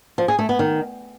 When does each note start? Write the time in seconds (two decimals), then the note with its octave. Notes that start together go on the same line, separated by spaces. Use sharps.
0.18 F3
0.28 G#4
0.39 A3
0.49 B3
0.59 D#3